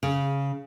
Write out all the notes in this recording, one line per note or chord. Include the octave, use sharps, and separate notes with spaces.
C#3